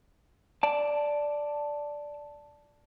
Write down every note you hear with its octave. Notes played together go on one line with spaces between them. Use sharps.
D5 A5